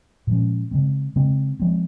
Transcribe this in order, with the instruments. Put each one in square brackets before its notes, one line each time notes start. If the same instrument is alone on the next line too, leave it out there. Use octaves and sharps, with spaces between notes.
[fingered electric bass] A#2 F3 G#3 C#4
C#3 G#3 C4
C#3 G#3 C4
F3 G#3 C4